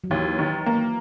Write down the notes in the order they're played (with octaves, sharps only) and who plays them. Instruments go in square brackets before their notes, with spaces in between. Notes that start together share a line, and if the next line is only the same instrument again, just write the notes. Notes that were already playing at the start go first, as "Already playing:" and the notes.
[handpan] F#3
[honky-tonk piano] D#2 [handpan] E3
[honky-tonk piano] D#3
A#3